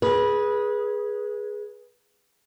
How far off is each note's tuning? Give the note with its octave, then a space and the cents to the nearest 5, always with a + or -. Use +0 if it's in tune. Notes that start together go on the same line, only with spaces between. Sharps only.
G#4 +0 B4 -20